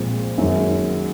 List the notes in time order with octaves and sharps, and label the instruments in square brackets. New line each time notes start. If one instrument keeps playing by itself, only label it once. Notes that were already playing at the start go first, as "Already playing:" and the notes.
Already playing: [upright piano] A#2 F3 G#3 C4
F#2 D#3 G#3